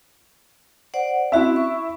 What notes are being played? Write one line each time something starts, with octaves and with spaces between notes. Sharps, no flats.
C5 D5 F#5
C4 C#4 E4 F#4 E5
C#6